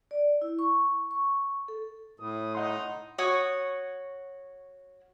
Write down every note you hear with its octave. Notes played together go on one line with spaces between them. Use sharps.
D5
E4
C#6
C#6
A4
A2 D#6
D#4 D#5 F#5 C6
F#4 C#5 D#6